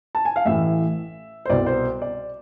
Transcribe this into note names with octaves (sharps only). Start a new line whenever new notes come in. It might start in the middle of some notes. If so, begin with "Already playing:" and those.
A5
G#5
F5
A1 A2 E3 E5
C5
C2 B2 D5
C5
D5